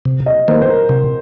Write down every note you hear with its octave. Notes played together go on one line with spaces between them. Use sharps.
C3
D#5
D#3 A#3 C5
C5
A#4
C3